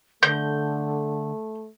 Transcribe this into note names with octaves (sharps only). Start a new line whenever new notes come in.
D3 A3 G6